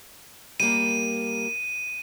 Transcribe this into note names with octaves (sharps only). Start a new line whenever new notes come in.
G3 A#3 D#7